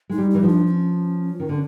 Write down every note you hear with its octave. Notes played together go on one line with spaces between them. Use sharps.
G#3 D#4
G3
E3 D#4
F3
D4
D4
C#4
D#3
D3